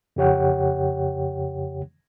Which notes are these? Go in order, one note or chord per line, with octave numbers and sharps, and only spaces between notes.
F2 C#3 G4 C#5 F#5 G5